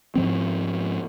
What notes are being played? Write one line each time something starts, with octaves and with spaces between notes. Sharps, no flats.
G#2 F3 C4